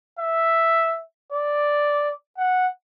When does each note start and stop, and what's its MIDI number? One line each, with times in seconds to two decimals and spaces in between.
0.19 0.99 76
1.32 2.12 74
2.37 2.67 78